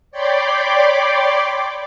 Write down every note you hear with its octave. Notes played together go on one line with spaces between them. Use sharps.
C#5 D5 G5 B5 C6 D6